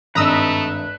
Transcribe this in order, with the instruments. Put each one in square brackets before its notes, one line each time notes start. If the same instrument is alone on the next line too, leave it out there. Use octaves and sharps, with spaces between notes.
[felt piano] G#1 G2 D#5 [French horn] A3 [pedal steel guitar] B4 [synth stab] A#5 D#6 E6